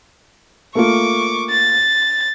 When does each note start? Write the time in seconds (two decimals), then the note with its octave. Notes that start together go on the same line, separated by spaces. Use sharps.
0.75 A3 A#3 F4 C#6 D6
1.50 A6